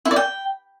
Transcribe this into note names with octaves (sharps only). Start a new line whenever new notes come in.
E4
D5
G5